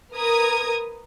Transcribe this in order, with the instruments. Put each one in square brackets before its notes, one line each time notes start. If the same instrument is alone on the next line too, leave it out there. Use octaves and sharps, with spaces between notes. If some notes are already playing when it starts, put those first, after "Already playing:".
[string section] A#4 B4 A#5 D#6 G#6